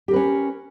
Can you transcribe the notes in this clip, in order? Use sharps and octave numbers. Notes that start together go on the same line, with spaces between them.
C#4 G4 A#4 B4